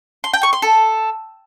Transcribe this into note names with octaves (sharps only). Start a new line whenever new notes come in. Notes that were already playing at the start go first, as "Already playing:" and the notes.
C6
G5
C#6
C6
A4